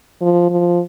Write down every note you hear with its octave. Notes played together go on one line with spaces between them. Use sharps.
F3
F3